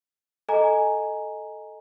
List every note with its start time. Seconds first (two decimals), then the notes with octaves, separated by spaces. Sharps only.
0.49 A4 D#5 G#5 A#5